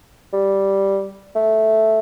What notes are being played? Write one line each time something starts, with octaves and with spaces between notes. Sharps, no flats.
G3
A3